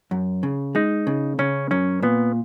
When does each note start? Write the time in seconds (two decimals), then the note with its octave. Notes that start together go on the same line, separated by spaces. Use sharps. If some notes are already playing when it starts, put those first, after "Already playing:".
0.11 F#2
0.43 C#3
0.75 G#3 D#4
1.07 C#3
1.39 C#3 C#4
1.71 F#2 C#4
2.02 A#2 B3